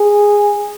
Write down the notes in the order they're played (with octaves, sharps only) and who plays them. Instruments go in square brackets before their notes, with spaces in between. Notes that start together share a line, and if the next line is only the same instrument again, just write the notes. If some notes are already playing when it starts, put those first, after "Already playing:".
Already playing: [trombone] G#4